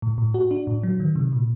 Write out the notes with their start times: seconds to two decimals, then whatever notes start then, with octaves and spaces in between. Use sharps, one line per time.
0.02 A2
0.18 A2
0.34 F#4
0.51 D4
0.67 A2
0.83 F#3
1.00 D#3
1.16 C3
1.33 A#2